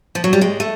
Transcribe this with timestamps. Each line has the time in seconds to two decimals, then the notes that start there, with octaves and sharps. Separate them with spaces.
0.15 F3
0.24 F#3
0.33 G3
0.41 G#3
0.60 A3